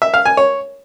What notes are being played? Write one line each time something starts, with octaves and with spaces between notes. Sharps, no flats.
E5
F5
G#5
C#5